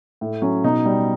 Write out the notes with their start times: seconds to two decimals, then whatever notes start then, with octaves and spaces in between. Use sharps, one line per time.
0.21 A2
0.42 F#3 C#4
0.64 B2 D#4
0.86 G3